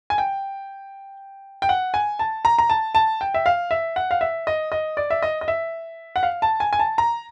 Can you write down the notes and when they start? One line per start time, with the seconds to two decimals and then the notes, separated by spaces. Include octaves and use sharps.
0.10 G#5
0.18 G5
1.62 G5
1.69 F#5
1.94 G#5
2.19 A5
2.45 A#5
2.58 A#5
2.70 A5
2.95 A5
3.21 G5
3.34 E5
3.46 F5
3.71 E5
3.96 F#5
4.11 F5
4.21 E5
4.47 D#5
4.72 D#5
4.97 D5
5.10 E5
5.22 D#5
5.41 D#5
5.48 E5
6.16 F#5
6.23 F5
6.42 A5
6.60 G#5
6.73 G#5
6.79 A5
6.98 A#5